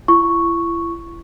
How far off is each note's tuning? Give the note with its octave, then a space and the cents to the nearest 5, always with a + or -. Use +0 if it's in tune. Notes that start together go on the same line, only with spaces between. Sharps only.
E4 +40 C#6 +0